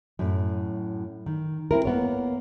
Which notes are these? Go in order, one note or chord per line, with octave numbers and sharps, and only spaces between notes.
F#2 A2
D#3
C4 E4 A#4
A#3 B3 C#5